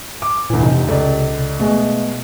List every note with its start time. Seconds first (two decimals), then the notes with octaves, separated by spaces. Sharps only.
0.22 D6
0.50 D2 A#2 E3
0.62 F1 C3 D#4
0.88 C#2 A4 D5
1.60 B2 G#3 A3